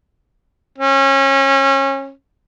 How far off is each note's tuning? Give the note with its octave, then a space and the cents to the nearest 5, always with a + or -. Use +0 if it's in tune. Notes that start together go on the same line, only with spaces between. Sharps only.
C#4 -25